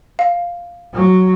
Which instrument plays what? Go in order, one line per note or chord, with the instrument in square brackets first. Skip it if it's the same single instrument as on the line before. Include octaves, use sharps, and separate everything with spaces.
[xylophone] F5
[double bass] F#3